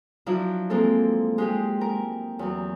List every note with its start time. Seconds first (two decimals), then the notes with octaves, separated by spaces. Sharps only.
0.26 F3 F#3 D4 E4
0.70 G#3 A#3 C4 A4
1.38 G#3 G4 G#4
1.81 A#4
2.39 E2 F#3